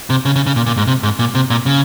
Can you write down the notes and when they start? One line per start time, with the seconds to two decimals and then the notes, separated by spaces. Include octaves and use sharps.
0.10 C3
0.25 C#3
0.36 C#3
0.47 C#3
0.56 A#2
0.66 A#2
0.77 G#2
0.87 C3
1.03 G#2
1.19 A#2
1.35 C3
1.50 A#2
1.66 C#3